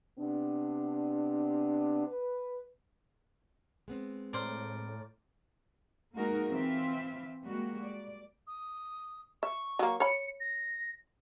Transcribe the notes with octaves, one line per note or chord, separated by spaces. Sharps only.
C3 B3 D4
B4
G#3 B3 C4
A2 A#4 C5 D5
G#3 A#3 D#4 F#4 G#4 A#4
E3 C4 F4 E5
G3 G#3 A#3 F#4
D5
D#6
E5 C#6
F#3 A#3
C#5 B5 C#7
A#6